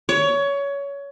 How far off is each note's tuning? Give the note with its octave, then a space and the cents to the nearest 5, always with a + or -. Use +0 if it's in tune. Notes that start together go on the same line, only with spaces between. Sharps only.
C#5 +20